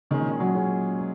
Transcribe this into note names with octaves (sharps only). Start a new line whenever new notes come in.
A#2 D#3 G#3 C#4 G#4
F#3
A#2 G#3 C#4 G#4
A#2 G#3